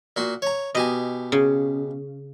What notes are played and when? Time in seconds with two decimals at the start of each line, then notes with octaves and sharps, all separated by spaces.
0.16 A#2 F#4 C6
0.42 C#5 A#5
0.75 B2 G4 D#5 G#5
1.32 C#3